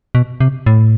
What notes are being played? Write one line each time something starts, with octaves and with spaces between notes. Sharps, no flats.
B2
C3
A2